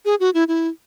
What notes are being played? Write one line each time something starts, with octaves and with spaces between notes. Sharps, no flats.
G#4
F#4
E4
E4